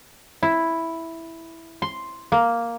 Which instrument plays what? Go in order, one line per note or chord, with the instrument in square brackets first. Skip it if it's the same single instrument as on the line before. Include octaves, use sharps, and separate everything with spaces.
[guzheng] E4
C6
A#3